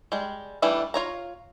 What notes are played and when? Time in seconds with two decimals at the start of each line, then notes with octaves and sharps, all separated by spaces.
0.12 G3 G#3
0.62 E3 G3 A3 D4 E4
0.94 F4 C#5 A#5